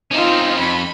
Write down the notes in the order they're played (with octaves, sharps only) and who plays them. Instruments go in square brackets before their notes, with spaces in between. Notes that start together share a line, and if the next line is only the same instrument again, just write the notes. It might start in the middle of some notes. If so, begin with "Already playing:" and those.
[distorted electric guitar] C4 C#4 [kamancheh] D#4 F4
[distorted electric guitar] F2 [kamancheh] B5